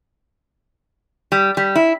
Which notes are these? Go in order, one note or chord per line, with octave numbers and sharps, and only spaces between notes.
G3
G3
E4